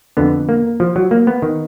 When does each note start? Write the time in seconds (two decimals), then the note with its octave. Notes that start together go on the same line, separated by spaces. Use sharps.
0.17 F2 D3 B3
0.49 A#3
0.80 F3
0.96 F#3
1.11 A#3
1.27 B3
1.42 D#3